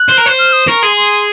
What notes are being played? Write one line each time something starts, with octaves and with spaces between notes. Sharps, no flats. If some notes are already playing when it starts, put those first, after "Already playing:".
Already playing: F#6
C5
A#4
C5
F6
D#6
A#4 C#6
G#4 C6
C6